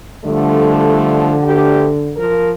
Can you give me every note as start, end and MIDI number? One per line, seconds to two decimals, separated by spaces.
0.24 2.17 50
0.24 1.35 53
0.24 1.35 55
0.24 1.35 57
1.43 1.89 38
1.43 1.89 67
2.16 2.50 53
2.16 2.50 70